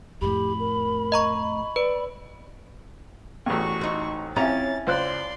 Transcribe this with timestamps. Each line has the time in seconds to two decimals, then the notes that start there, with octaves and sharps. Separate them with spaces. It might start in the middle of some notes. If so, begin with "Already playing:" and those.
0.21 F2 A2 G4 B5
0.59 A#4
1.12 D#5 A#5 C#6
1.76 B4 D5 D7
3.46 A1 E2 F#4 C#6
3.81 C4 D#4
4.36 F2 C#4 E4 G4 A#5 A6
4.87 C#2 C5 D5 C6 F#6